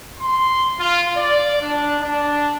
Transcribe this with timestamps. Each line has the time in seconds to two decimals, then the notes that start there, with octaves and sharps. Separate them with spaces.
0.20 C6
0.79 F4
1.17 D5
1.62 D4
2.01 D4